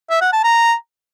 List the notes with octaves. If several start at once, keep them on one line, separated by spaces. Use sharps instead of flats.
E5
F#5
A5
A#5